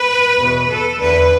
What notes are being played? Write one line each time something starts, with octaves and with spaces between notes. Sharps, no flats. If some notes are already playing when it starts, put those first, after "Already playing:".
Already playing: B4
E2 B2
A4
E2 D3 B4